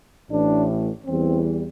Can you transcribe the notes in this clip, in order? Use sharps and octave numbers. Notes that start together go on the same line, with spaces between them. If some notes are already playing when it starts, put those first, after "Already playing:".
A1 A2 E3 D4
E2 E3 G3 C4